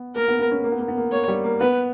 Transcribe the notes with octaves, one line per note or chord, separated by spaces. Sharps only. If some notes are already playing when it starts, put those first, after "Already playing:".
Already playing: B3
A#3 A#4
B3
B3
C#4
A#3
B3
A#3
B3
A#3
A#3 C#5
G3
A#3
B3 B4